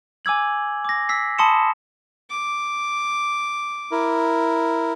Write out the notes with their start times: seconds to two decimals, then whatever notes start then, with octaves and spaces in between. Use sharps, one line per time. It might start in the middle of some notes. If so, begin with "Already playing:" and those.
0.25 G#5 D6 E6 G#6 F#7
0.85 D6 A#6
1.09 E6 B6 C7
1.38 A5 B5 C6 D#6 C#7 E7
2.30 D6
3.92 E4 A#4